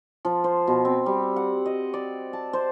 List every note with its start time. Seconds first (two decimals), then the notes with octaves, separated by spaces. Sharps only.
0.25 F3
0.44 C5
0.67 B2
0.85 C4
1.06 G3
1.36 F#5
1.66 D#5
1.94 D5
2.33 A5
2.53 C5